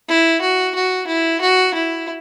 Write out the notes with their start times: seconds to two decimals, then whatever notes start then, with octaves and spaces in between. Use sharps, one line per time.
0.08 E4
0.41 F#4
0.75 F#4
1.07 E4
1.41 F#4
1.74 E4